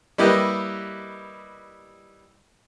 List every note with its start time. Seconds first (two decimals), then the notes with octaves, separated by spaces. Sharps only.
0.18 G3 A#3 E4 G4 B4 D#5